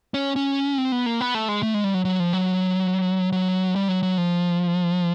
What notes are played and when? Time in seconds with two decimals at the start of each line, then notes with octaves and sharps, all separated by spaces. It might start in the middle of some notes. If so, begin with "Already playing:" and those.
0.14 C#4
0.36 C#4
0.78 C4
0.92 B3
1.06 A#3
1.21 B3
1.35 A3
1.48 G#3
1.63 A3
1.74 G#3
1.84 G3
1.94 F#3
2.05 F#3
2.20 F3
2.33 F#3
3.32 F#3
3.76 G3
3.89 F#3
4.03 F#3
4.18 F3